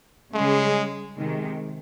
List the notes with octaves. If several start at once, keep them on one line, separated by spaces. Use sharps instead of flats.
C#3 G3 G#3 C#4 G#4
C3 D#3 G#3